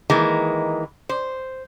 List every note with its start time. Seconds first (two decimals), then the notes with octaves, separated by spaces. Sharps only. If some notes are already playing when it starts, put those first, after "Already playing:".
0.10 D#3 E3 G#3 A#3
1.09 C5